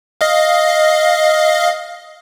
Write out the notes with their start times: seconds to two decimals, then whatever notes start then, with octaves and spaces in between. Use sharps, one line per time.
0.21 D#5 F5